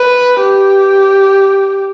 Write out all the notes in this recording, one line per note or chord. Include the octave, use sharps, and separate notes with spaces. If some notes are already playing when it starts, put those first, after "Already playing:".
Already playing: B4
G4